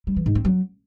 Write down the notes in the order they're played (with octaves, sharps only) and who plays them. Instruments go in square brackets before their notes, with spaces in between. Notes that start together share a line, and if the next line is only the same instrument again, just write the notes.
[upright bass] G3
E3
G#2
C4
F#3